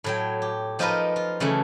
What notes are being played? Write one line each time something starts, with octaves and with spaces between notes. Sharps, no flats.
A2 F#3 G5
G4
F3 D#4 F4 A#4 B4 D#5
F4
C#3 E3 F#3 A3